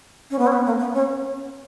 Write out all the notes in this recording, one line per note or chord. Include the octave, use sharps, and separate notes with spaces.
C#4
B3
C#4
B3
A#3
B3
C#4